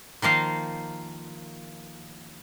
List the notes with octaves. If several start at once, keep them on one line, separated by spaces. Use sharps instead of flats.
D#3 F3 A#3 F5